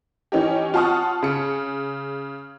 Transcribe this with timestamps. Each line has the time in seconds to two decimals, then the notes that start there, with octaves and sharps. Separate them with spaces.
0.32 E3 C#4 D#4 G4
0.74 F4 F#5 A5 C#6 D#6 F6
1.22 C#3 C#7